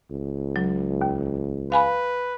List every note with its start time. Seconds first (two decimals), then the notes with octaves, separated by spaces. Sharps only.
0.11 C#2
0.56 F#3
1.01 D#2
1.72 B4 F5 G#5 B5